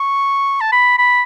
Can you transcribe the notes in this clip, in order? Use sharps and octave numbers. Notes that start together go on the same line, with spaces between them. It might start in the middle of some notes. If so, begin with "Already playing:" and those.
Already playing: C#6
A5
B5
B5